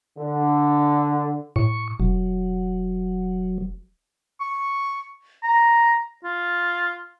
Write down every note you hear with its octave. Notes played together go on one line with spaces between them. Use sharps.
D3
A2 C#6
E1 F#3
C#6
A#5
F4